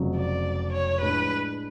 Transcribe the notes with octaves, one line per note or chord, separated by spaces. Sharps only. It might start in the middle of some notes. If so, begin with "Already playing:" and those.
Already playing: F1 F2 C#3 F#3
D5
C#5
A2 F3 G#3 D4 B4